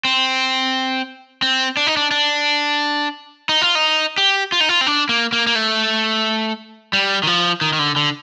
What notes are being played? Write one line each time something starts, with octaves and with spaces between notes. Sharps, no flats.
C4
C4
D4
D#4
D4
D4
D#4
F4
D#4
G4
F4
D#4
F4
C4
D4
A#3
A#3
A#3
A3
G3
D#3
F3
D#3
D#3
D3
D3